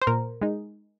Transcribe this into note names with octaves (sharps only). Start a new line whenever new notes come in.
C5
A#2 A#4
G#3 D#4